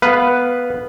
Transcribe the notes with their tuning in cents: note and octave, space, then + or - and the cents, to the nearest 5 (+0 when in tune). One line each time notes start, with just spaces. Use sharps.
B3 +0 B4 +0 F5 +0